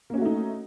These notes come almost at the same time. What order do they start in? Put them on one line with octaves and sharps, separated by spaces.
A#3 C#4 F#4 A3 D#4